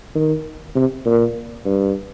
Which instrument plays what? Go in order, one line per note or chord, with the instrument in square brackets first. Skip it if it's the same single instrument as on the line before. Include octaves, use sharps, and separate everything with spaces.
[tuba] D#3
C3
A#2
G2